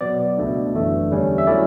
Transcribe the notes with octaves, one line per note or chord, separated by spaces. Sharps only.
B2 F#3 B3 D5
C#2 B2 A3 D4
G1 F#2 E3 A3 D4
E2 D3 G3 C#4
E5
F#3 A3 C#4 E4 D5